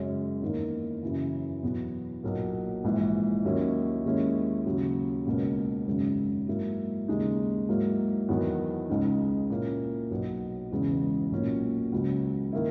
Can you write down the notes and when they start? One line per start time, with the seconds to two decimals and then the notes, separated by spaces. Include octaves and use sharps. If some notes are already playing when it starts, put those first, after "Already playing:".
Already playing: F#2 C#3 G#3 C#4
0.42 E2 D#3 A#3 D#4
1.03 F#2 C#3 E3
1.63 E2 B2 F#3 B3
2.23 B1 A#2 F#3 A#3
2.84 A#1 G#2 E3
3.44 D#2 D#3 F#3 C#4 E4
4.05 D#2 D#3 G#3 C#4 E4
4.66 D#2 C#3 F#3
5.26 C#2 B2 A#3 C#4
5.87 G#1 F#2 C#3 G#3
6.48 G#2 F#3 A#3 E4
7.08 D#2 C#3 G#3 D#4
7.69 G#2 F#3 A#3 E4
8.28 E2 D#3 F#3 B3
8.90 C#2 C#3 G#3 D#4
9.50 A#2 A#3 C#4 E4
10.11 B1 B2 F#3 B3
10.71 E1 E2 C#3 G#3
11.31 B1 A#2 F#3 C#4
11.92 C#2 C#3 F#3 C#4
12.53 D#3 A#3 E4